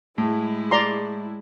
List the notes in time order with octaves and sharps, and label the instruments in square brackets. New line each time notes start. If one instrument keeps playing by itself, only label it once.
[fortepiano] A2 [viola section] G#3 E4
[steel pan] D5 A#5 C6